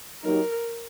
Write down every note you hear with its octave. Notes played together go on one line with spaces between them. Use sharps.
F#3 A#3 D#4 G4 A#4